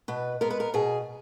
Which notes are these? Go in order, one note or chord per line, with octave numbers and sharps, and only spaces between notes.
B2 B4
G#3 B3 A#4
B4
A#4
B2 G#4